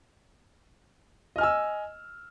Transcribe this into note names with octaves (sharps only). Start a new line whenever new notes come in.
D#5 G#5 E6 F6